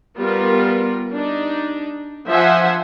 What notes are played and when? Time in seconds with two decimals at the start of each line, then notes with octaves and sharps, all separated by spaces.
0.17 G3 B3 F4 A#4
1.12 D4 D#4
2.28 F3 C5 E5 F#5 G#5